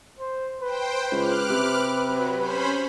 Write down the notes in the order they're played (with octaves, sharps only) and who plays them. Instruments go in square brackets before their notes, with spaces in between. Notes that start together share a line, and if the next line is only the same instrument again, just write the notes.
[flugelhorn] C5
[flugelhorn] B4 [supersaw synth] C5 G5
[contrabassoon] C#2 [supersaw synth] D6 F6 F#6
[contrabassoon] C3
[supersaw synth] F#3
C#4 C5 B5